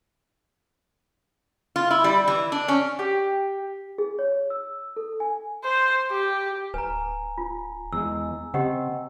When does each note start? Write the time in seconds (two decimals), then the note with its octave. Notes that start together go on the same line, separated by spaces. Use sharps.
1.76 F4
1.91 E4
2.04 G3
2.28 E3
2.52 D4
2.68 C#4
2.99 G4
3.98 G#4
4.19 C#5
4.50 E6
4.97 A4
5.20 G#5
5.64 C5
6.10 G4
6.74 D1 B4 G#5 A#5
7.38 F4
7.93 E2 G#3 E6
8.54 C#3 C4 G4 D#5 F#5